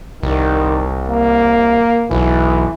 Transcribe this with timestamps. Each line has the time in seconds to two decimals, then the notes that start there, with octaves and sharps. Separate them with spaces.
0.23 C2 D#3
1.08 A#3
2.11 B1 E3